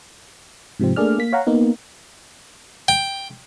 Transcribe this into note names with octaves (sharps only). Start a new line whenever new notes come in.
G#2 C3 F3 C4
A3 A#3 D4 G#4 D5 F6
A#3 B6
C#5 F5 F#5 A#5
A#3 B3 D#4
G5